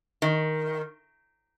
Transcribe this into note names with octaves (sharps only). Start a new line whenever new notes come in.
D#3